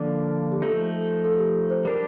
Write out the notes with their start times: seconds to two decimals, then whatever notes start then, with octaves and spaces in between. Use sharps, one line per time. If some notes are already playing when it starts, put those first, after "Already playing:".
Already playing: D3 F3 A#3 D4 A4
0.52 G4
0.62 F3 A3 D#4 A4
1.24 A4
1.39 G4
1.70 C5
1.85 G3 D4 G4 A#4